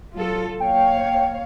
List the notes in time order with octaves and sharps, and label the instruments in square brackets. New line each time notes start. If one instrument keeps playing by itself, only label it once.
[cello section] F#3 F4 A4
[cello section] A#3 C#5 F5 [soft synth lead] G5